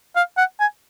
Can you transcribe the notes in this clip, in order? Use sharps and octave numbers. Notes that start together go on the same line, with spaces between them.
F5
F#5
G#5